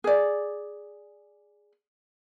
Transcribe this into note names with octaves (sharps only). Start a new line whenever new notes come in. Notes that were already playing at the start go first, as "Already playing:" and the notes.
G#4 D5